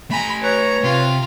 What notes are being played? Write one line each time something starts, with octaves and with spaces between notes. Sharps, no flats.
A3 G#5 A#5 B5
B4 C#5 A#5
C3 F4